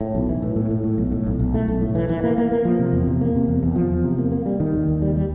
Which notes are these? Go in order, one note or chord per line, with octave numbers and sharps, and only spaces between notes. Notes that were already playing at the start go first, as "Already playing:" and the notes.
A2
B1
E3
A2
A2
A2
A2
B1
A2
B1
B1
A3
B1
A2
E3
E3
A#3
A#3
A#3
F3
C3
E2
C3
A#3
C3
E2
E2
F3
E2
C3
A#3
A#3
G3
D#3
D#2
D#2
G3
G3